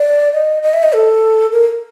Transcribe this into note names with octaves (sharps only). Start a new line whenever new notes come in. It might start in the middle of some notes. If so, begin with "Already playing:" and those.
Already playing: D5
D#5
D#5
E5
D#5
A4
A#4